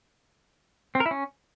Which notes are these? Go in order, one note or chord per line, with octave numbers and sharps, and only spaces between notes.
C4
A#4
E4
C#4